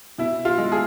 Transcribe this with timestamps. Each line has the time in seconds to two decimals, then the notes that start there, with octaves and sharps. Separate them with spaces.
0.18 B2 E4
0.45 F4
0.58 G#3
0.72 G#4